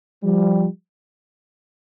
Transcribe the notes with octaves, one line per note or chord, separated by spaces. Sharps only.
F3 G3